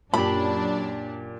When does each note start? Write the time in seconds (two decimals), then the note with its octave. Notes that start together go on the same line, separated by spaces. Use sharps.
0.14 F#2 A#2 D4 G4 B5